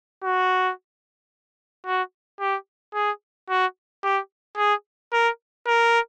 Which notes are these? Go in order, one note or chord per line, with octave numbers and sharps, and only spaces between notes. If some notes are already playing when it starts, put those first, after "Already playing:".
F#4
F#4
G4
G#4
F#4
G4
G#4
A#4
A#4